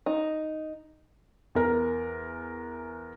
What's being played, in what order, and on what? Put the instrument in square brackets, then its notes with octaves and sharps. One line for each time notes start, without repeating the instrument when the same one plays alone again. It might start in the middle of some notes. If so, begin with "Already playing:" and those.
[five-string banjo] D#4
[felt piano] E2 A#4